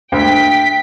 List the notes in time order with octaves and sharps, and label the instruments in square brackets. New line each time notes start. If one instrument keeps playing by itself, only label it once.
[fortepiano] D2 A#3 [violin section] G5 B6